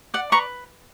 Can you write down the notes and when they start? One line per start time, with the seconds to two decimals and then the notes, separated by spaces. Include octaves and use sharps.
0.14 D5 F#5
0.32 B4 A#5 C#6